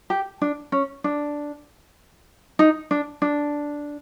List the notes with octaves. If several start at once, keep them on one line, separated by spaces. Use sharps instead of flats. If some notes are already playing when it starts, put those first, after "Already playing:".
G4
D4
C#4
D4
D#4
D4
D4